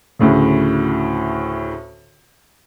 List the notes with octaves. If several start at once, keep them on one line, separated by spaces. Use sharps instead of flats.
D2 A2 C#3